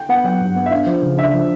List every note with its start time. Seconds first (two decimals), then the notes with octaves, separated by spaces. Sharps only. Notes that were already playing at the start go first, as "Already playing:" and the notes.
Already playing: G5
0.09 B3 F#5
0.24 F#3 G5
0.41 G2
0.56 B3
0.66 E5
0.71 D4 F5
0.86 F3
1.02 C#3
1.18 D4 E5
1.33 F3